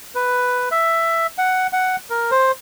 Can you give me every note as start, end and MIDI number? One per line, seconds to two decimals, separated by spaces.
0.15 0.69 71
0.71 1.27 76
1.38 1.67 78
1.73 1.96 78
2.10 2.31 70
2.31 2.52 72